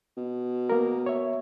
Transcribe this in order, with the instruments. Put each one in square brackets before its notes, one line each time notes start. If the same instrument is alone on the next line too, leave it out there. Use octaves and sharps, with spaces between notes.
[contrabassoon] B2
[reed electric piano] A#3 A#4
C#5 E5